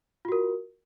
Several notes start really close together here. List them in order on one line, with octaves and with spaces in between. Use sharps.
F4 F#4 A#4